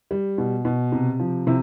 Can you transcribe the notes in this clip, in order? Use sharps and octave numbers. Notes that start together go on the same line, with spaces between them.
G3
B2
B2
C3
F3
C3 C4 E4